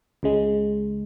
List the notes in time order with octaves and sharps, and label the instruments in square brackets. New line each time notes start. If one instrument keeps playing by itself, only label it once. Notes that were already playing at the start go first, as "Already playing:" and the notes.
[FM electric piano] C#2 C#3 G#3